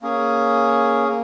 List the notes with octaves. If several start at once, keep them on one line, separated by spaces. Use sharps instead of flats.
A#3 C#4 G#4
A#3